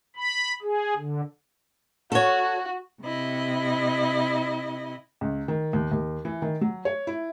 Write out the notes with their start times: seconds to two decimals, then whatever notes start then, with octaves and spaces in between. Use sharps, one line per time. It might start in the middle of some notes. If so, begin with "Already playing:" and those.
0.17 B5
0.62 G#4
0.97 D3
2.12 F#4 A4 C#5
3.02 C3 E4 D#5
5.21 C#2
5.48 D#3
5.73 D#2
5.92 D#2
6.25 E3
6.42 D#3
6.61 F#3
6.85 C#5
7.07 E4